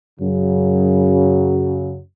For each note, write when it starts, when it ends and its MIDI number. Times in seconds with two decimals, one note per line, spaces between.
0.20 1.99 42
0.20 1.99 49
0.20 1.99 54